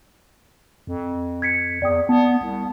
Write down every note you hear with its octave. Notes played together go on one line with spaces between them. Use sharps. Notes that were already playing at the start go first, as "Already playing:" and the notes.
F2
G#6 B6 C#7
E2 D5 G5 D#6
B3 A5
C2